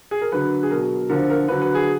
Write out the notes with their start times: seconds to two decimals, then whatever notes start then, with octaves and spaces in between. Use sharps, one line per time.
0.11 G#4
0.22 A#4
0.32 D3 F#3 B4
0.63 G#4
0.71 B2 F#3 A#4
1.09 D3 F3 A#4
1.30 A#4
1.48 D3 F#3 B4
1.62 B4
1.75 G#4